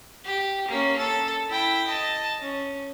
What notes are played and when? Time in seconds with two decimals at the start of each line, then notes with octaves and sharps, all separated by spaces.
0.25 G4
0.68 A#3 C#4
0.98 A4
1.49 E4 G5
1.87 D#5 A5
2.40 C#4